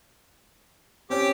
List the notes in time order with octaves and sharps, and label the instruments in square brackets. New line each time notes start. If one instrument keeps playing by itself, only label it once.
[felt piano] C4 C#4 [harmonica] G4